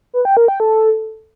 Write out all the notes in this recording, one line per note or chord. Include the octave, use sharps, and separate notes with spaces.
B4
G5
A#4
G5
A4